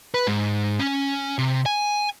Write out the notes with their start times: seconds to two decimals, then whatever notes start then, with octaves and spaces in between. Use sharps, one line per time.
0.14 B4
0.27 G#2
0.79 C#4
1.39 C3
1.66 G#5